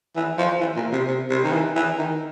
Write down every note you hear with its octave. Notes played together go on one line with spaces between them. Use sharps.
E3
F3
E3
A#2
C3
C3
C3
D#3
E3
E3
D#3